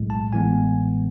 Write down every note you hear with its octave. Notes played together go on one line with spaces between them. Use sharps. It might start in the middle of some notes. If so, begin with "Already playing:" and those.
Already playing: B1 A2 G#3
A5
A1 A2 E3 G#3 B3 G#5